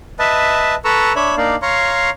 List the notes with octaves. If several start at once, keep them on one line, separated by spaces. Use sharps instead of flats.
B4 D#5 E5 A5
A4 B4 A#5 C#6 E6
D4 C#5 E5 B5
A#3 D4 D#4 D5 F5
C#5 F5 A#5 C6 C#6